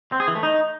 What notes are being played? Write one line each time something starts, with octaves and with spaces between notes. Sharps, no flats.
C4
G#4
E3
A3
D#4